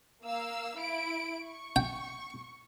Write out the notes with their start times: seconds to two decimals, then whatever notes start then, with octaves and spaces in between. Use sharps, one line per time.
0.23 A#3 F5 E6
0.77 E4 D7
1.44 C#6
1.76 G5